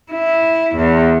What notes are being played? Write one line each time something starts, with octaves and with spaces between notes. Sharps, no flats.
E4
E2